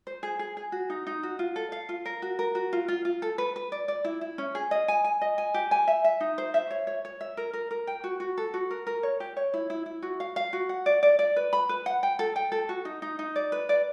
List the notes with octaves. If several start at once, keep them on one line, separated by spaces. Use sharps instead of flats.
C5
G#4
G#4
G#4
F#4
D#4
D#4
F#4
F4
A4
F5
F4
A#4
F#4
A#4
F#4
F4
F4
F4
A4
B4
B4
D5
D5
E4
E4
C#4
G#4
D#5
G#5
G#5
D#5
G#5
G4
G#5
E5
E5
D#4
C5
E5
C#5
C#5
C#5
E5
A#4
A#4
A#4
G5
F#4
F#4
A4
F#4
A#4
A#4
C#5
G4
C#5
E4
E4
E4
F#4
F5
F5
F#4
F#5
D5
D5
D5
B4
B5
B4
F#5
G5
A4
G5
A4
F#4
D#4
D#4
D#4
D5
B4
D5